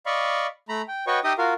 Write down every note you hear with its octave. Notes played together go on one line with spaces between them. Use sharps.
D5 D#5 F5 B5 C#6
A3 A#5 B5
G5
F#4 B4 C#5 D#5 G5 C#6
D#4 G4 D#5 E5 G5 D#6
F4 F#4 A#4 F5